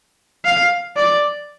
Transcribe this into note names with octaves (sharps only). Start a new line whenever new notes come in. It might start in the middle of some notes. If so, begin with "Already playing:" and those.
F5
D5